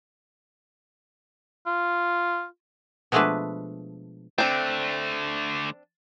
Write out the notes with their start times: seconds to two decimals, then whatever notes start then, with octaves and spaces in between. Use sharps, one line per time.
1.66 F4
3.12 B2 F3 G#3 A3 D4 B4
4.38 D3 A3 C4 D4